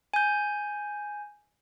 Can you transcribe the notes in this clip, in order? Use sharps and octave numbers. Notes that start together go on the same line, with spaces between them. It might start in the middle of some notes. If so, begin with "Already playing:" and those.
G#5 G6